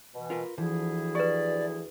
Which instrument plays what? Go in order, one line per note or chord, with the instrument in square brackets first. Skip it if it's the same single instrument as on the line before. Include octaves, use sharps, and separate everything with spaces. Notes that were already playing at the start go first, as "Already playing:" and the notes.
[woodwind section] B2 E3
[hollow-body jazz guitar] F4 A#4 B4
[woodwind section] D2 E4 G#4 [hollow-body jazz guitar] E3 F3
[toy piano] G4 B4 [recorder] D5